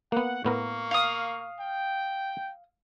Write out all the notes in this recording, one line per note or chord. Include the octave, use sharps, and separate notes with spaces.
A#3 B3 F#5
A2 A#3 B3 A#4 C#6
F5 D#6
G5